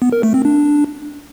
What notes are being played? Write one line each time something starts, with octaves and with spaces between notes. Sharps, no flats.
B3
A#4
A3
C4
D4